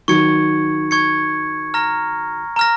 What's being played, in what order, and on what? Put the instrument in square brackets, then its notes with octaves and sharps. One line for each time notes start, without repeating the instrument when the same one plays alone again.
[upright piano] D#3 F#3 [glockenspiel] C#6 G#6 C#7
[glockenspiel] C#6 G#6 C#7
A#5 F6 A#6
A#5 F6 A#6